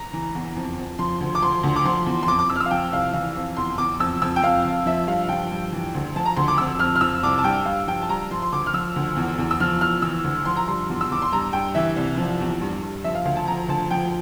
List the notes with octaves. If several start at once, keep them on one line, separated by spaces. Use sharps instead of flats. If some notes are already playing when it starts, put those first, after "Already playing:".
Already playing: A#5
E3
E2
F2
F2
F3 C6
D2
D6
F3 C6
D2
D6
F3 C6
E2
C6
F2 D6
D6
F2 E6
F6
E6
F5
F3 G5
C2 F5
E3 F5
F2
E2 C6
E2 D6
F2 E6
F2 E6
G5
F2 F5
F2
F3 E5
G2 F5
F5
F3 G5
G2
E3
D2
F3 A5
A#5
D2 C6
D6
F2 E6
F2 F6
F6
F3 E6
C2 D6
A5
G2 G5
G2 F5
F3 G5
A5
G2 A#5
F3 C6
C6
D2 D6
F6
F3 E6
D2
E2
E2
E6
F3 F6
E2 F6
E3 E6
D2
F3 C6
A#5
G2 C6
E2
E6
E2 D6
C6
G2 A#5
G2 G5
E3 E5
C2
F3
E2
G2
G2
F3 E5
F5
D2 F5
A5
F3 A#5
D2 A5
F3 G5